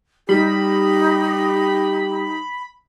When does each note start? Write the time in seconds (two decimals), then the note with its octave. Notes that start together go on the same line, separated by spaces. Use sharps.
0.29 G3 D#4 G4 B5